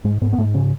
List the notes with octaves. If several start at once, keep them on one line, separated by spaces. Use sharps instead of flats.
G#2 G#3
G#2 B3
B3
G#2 A3
C#3 C#4